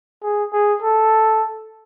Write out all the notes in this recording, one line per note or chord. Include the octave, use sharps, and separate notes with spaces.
G#4
G#4
A4